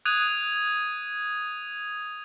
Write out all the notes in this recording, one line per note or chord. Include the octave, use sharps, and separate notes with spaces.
D#6 F#6 G#6 D#7 F7